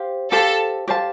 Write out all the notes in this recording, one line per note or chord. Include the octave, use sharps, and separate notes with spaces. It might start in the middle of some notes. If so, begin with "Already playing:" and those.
Already playing: G4 C5 F5
G4 A4 C5 F5 A5
G4 C5 F5 A5